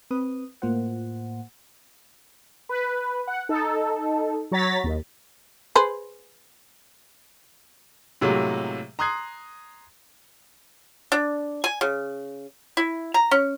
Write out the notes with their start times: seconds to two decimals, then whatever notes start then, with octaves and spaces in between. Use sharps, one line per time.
0.11 C4 B4 D#6
0.62 A2 A#3 F4 C5 F#5
2.69 B4
3.27 F#5
3.49 D#4 A4
4.51 F#3 C#5 A#5 A6 B6
4.84 D#2
5.75 G#4 B4 C5
8.21 A2 C3 F#3 G#3 A#3
8.99 A#5 C6 D#6 F#6 G#6 C7
11.12 D4
11.64 G#5
11.81 C#3
12.77 E4
13.14 A#5
13.31 C#4